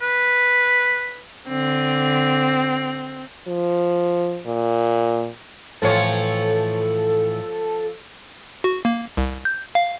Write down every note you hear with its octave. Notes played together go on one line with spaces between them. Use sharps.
B4
D3 C4
F3
A#2
A2 E3 F3 F4 A4 C#5
F#4
A#3
C2
G6
F5